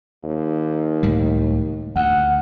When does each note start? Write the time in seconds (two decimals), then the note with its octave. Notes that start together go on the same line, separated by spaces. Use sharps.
0.23 D#2
1.03 C#2 A2 G3
1.96 D2 F#5